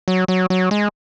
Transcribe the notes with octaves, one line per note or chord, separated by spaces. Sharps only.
F#3
F#3
F#3
G#3